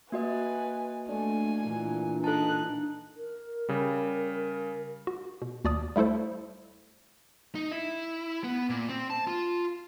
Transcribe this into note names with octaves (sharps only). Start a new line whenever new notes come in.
A#3 F#4 B4 D#5 G#5
A3 D4 G#5
A#2 E3
D#4 A4 A5 F#6
A#4
C#3 G3
F#4
B2
D#2 F#4 D5 A5 D#6
G3 A3 E4 A4 C5
D#4
E4
B3
A#2
C4
A5
F4